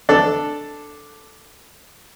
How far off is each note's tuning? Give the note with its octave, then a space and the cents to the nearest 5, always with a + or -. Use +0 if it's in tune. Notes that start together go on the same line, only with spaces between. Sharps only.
D4 +0 A4 +0